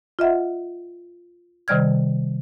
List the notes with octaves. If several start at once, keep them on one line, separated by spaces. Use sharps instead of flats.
F4 D#5 E5 F#5
C3 D#3 G3 D5 F6 G#6